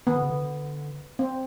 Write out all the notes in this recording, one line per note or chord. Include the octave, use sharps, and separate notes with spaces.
D#3 B3
D3
C#3
D3
C4